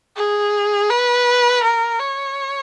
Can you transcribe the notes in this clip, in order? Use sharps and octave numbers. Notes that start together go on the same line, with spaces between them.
G#4
B4
A#4
C#5